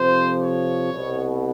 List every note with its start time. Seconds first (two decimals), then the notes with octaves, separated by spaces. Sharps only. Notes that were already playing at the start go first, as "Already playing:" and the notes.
Already playing: F2 C3 F3 C5
0.39 C#5
0.90 C2 B2